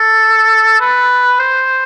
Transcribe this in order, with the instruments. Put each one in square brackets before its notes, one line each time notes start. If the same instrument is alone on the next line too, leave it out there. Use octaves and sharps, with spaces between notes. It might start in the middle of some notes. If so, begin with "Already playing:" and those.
Already playing: [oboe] A4
B4
C5